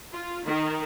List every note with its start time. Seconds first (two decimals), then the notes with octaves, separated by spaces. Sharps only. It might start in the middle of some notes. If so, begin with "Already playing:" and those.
0.13 F4
0.46 D#3